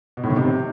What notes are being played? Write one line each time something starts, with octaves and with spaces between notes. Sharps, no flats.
B2
A2
D#3
C3